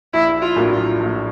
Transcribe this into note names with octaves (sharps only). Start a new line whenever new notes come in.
A#1 E4
F4
A2 F#3 A#3 D4
F4
A#1